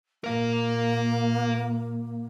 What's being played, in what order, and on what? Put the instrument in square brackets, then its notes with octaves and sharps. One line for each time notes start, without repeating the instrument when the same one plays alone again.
[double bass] A#2 [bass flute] A#3 [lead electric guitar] A#4 F5